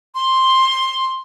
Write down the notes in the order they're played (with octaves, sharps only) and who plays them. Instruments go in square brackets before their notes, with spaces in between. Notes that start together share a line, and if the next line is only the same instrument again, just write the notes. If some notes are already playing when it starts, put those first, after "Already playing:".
[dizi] C6